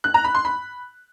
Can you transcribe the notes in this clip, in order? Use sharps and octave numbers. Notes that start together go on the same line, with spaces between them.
F#6
A#5
B5
C6
B5